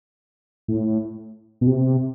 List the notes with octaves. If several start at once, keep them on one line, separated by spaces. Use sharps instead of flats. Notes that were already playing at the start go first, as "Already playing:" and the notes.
A2
B2
C3